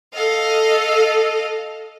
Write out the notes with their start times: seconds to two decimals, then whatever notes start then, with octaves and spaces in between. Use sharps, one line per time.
0.13 A4 D#5 F5